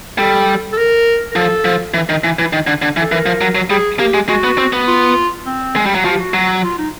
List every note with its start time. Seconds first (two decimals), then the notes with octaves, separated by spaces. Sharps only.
0.18 G3 A4
0.72 A4
0.78 A#4
1.31 A#4
1.36 F3 A4
1.65 F3
1.94 E3
2.09 D#3
2.24 E3
2.39 E3
2.53 D#3
2.67 D3
2.82 D3
2.97 E3
3.01 A4
3.11 E3 A#4
3.26 F3
3.41 F#3
3.55 F#3
3.70 G3 G#4
3.99 A#3 G4
4.14 G#3
4.29 G#3 F#4
4.44 B3
4.58 C4
4.73 B3
4.87 F4
5.46 C4
5.76 G#3
5.85 G3
5.95 F#3
6.04 F3 F#4
6.11 G4
6.20 F#4
6.34 F#3
6.63 F4
6.78 D#4